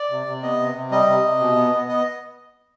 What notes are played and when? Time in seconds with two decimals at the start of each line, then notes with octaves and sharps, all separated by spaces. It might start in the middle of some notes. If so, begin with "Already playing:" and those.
Already playing: D5
0.10 C3
0.26 C3
0.43 B3 D#5
0.59 C3
0.75 C3
0.91 G3 D#5
1.07 C3
1.24 C3
1.40 B2
1.55 B3
1.72 B3
1.88 B3 D#5